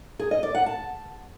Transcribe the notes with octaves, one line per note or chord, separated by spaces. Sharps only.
G#4
D#5
D5
F#5
A5